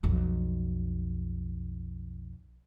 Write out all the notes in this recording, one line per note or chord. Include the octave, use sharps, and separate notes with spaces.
B1 F2